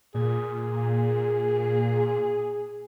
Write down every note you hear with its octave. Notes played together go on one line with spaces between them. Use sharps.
A#2 G#4